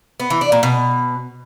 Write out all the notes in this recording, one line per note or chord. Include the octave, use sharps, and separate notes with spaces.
B3
E3
D4
A#2
B2